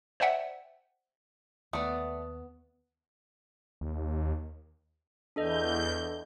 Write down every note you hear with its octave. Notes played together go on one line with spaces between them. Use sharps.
C5 D5 E5 F#5 G5
D#2 A3 B3 D5 D#6
D#2
E2 D4 A4 D#5 G6